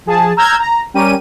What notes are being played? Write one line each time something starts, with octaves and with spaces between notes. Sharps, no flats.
F3 G#4 A5
A#5 E6 F6 G6 G#6
A#5
G3 C#4 G4 A#4 D#7